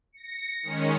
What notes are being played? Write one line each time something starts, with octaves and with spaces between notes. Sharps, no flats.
A#6 C#7
D#3 G#3 C#4